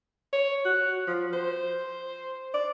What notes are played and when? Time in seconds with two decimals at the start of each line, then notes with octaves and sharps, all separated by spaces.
0.33 C#5
0.65 F#4
1.07 F3
1.33 C5
2.54 D5